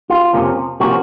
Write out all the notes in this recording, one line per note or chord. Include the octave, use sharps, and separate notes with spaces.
F4
F2 C3 F3 A#3 C#4
C3 F3 A#3 C#4 F#4